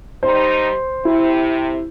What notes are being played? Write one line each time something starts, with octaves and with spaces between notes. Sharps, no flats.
G3 D#4 C5
C3 E4